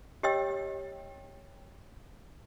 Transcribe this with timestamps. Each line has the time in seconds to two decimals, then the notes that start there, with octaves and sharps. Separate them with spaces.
0.23 G4 C#5 D#5 G5 E6